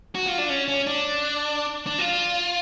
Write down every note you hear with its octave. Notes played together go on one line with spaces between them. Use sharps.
F#4
F4
D4
C#4
C#4
D4
D4
F4